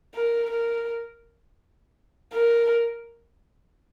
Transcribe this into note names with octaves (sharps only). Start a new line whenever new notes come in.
A#4
A#4
A#4